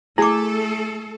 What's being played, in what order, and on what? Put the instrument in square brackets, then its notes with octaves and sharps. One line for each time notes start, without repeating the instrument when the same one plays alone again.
[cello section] A3 A4 [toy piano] E4 D6 [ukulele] G#4